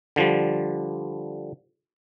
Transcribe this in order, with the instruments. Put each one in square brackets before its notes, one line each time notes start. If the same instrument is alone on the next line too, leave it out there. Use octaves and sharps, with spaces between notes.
[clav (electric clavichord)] D3 F3 G3